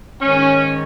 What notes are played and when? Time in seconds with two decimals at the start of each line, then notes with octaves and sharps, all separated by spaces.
0.22 G#2 D#3 C#4